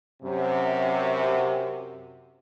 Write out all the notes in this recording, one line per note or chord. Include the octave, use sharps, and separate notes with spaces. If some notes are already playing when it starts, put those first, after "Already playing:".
F#2 C3